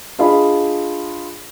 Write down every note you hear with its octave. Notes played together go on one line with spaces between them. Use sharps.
D4 F4 G#4 D#5 B5